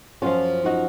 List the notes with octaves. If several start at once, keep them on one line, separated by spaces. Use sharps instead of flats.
F#2 F3 C#4 F4
D#4 F#4